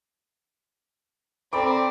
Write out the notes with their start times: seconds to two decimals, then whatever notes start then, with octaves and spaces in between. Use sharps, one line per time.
1.53 C4 A4 D5 G5 A#5 B5 D6